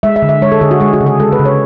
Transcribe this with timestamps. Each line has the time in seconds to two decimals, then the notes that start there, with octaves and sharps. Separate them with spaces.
0.03 G#3 E5
0.16 E5
0.22 D3
0.29 E5
0.42 G#3 C#5
0.52 A4
0.61 D3 G#4
0.71 F#4
0.81 G#3 G#4
0.93 F#4
1.00 C#3
1.06 G#4
1.20 G#3 A4
1.32 B4
1.39 C#3
1.45 C#5